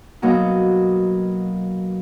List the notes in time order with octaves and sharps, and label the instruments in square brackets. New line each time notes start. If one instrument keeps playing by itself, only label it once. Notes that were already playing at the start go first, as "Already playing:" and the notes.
[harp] B2 F#3 A#3 D#4